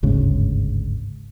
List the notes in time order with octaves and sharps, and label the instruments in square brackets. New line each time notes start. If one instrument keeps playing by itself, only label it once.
[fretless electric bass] G1 D2 G#2 C#3